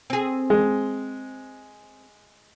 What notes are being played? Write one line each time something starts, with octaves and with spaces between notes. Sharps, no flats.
C4 G#4
G#3